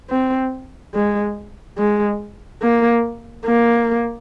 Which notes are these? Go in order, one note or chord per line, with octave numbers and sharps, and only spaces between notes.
C4
G#3
G#3
A#3
A#3